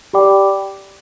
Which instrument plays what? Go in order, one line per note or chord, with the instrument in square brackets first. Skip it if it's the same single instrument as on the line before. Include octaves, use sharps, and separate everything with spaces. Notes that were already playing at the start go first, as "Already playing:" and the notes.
[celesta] G4 D5 G5 B5 D6